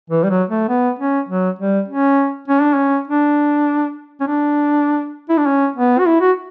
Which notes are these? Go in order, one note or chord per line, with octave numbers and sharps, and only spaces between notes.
E3
G3
F#3
A3
B3
C#4
F#3
G3
C#4
C#4
D4
C#4
D4
C#4
D4
E4
D4
C#4
B3
F#4
E4
F#4